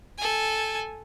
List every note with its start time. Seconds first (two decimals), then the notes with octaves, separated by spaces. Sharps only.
0.18 A4 G#5